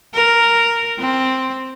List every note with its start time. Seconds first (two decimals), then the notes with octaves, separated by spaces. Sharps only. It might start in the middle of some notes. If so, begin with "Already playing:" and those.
0.15 A#4
0.99 C4